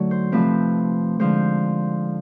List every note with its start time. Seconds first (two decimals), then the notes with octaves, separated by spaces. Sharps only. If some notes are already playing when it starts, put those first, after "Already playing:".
Already playing: D3 F#3 A3 D#4
0.11 C5
0.32 C3 F3 A3 C4 B4
1.19 D3 F3 G#3 C5